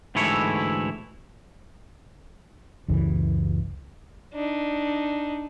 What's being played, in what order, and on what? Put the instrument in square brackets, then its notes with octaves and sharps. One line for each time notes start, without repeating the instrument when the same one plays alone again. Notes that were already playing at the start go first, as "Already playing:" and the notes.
[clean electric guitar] D2 G#2 E3 A3 E4 C#5
[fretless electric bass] F#1 C#2 E3
[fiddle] D4 D#4